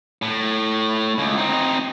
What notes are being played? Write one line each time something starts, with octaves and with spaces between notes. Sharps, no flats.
A2
C#2
C4 D#4